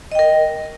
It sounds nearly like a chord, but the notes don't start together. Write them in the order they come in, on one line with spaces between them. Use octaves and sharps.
D#5 G5 A#4